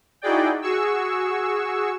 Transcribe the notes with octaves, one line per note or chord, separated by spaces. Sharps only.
D#4 E4 F#4 G#4 D5 G5
F#4 G#4 C#6 E6